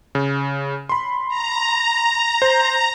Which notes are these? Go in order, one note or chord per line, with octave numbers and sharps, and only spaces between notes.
C#3
B5 C6
A#5
C5